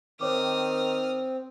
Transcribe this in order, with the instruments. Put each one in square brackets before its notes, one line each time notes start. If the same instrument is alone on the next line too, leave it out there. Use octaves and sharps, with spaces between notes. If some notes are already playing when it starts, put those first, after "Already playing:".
[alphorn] D#3 [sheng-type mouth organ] C4 [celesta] C#5 D6 [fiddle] D#6 F6